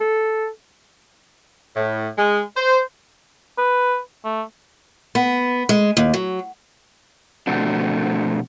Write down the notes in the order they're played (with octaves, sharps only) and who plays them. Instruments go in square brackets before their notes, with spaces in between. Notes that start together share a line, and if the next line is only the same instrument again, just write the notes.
[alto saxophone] A4
[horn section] A2
G#3
C5
[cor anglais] B4
A3
[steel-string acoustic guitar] B3
G#3
D#2
F#3
[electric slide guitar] B2 F3 A3 C4 D4 F#4